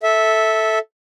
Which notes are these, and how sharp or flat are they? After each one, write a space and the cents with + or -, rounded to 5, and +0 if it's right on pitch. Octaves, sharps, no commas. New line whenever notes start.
A4 +0 E5 -10